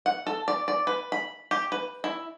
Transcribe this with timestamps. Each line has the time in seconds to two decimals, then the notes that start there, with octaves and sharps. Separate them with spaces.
0.06 F#5
0.27 A4
0.48 D5
0.68 D5
0.87 B4
1.12 B5
1.51 G4
1.72 B4
2.04 E4